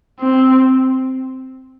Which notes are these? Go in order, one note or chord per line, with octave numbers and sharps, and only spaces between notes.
C4